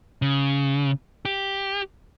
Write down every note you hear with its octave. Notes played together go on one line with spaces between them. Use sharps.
C#3
G4